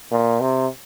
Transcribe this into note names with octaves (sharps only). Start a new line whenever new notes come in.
A#2
C3